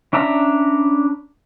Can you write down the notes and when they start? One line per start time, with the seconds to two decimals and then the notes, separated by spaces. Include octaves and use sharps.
0.13 C#4 D4 E5 A#5 B5